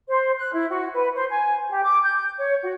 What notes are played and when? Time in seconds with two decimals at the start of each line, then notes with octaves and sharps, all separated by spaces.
0.08 C5
0.39 F#6
0.53 E4
0.70 F#4
0.93 B4
1.14 C5
1.29 G#5
1.69 G4
1.83 D6
2.02 G6
2.38 C#5
2.63 F#4